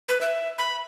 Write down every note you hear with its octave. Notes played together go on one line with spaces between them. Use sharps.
B4
E5
B5